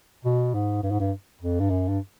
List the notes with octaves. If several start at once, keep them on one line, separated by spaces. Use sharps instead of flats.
B2
G#2
G2
G#2
G2
F2
G2
F#2
G2